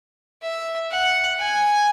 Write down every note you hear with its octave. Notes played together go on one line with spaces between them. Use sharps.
E5
F#5
G#5